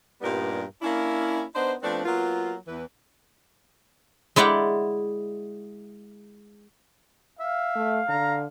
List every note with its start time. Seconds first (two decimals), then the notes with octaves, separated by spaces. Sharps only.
0.22 G2 A#2 G3 B3 D#4 A#4
0.82 A#3 C#4 D4 E4
1.54 B3 D4 D#4 C5
1.83 F3 A3 B3 C4 D4
2.05 F#3 A#3 B3 F4
2.67 E2 E3 B4
4.36 G#3 E4 D5 F#5 G5
7.40 E5 F5
7.75 A3
8.09 D3 A#5